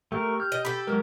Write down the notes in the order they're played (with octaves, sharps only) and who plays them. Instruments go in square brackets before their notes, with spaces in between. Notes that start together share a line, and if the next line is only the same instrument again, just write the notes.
[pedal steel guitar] A3 A#4 [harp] G4 [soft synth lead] C#6
[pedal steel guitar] F6 [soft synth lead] G6
[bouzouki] D#5
[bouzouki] G4 A4 [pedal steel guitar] B5
[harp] G#2 F#3 [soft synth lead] G#3 [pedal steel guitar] A#4